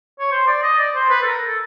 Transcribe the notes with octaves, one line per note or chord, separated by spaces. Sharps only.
C#5
C5
D5
D#5
D5
C5
B4
A4
A#4
A4